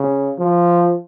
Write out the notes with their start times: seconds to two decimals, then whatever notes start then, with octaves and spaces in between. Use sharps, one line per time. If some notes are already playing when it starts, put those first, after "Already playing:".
Already playing: C#3
0.38 F3